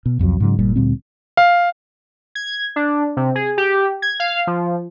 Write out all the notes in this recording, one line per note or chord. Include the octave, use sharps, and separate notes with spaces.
B2
C2 F2 C3 F#3
G#2 C#3 F#3
G1 A#2 G3
D2 A#2 G3 C4
F5
G#6
D4
C3
G#4
G4
G#6
F5
F3